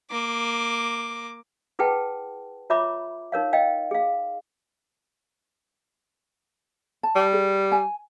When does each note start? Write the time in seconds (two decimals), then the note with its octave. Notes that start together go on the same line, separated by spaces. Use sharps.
0.11 A#3 D6
1.79 E4 G#4 B4 F#5 G5 A5
2.70 F4 C#5 E5 A#5 B5 D6
3.32 D#4 A#4 C#5 F5
3.53 D#5 F5 G5
3.91 G#4 F5
7.03 A5
7.15 G3
7.33 G#4
7.72 G#5